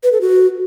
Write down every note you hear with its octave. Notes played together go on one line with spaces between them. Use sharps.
B4
A4
F#4